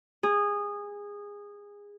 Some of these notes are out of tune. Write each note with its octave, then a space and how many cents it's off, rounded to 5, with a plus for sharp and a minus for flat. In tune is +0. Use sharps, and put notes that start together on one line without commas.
G#4 -20